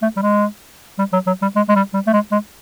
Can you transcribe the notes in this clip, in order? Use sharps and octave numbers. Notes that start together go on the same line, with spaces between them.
A3
G3
G#3
G3
F#3
F#3
G3
G#3
G#3
G3
G3
A3
G#3
G#3